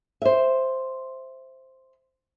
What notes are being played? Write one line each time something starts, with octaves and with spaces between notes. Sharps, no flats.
C5 E5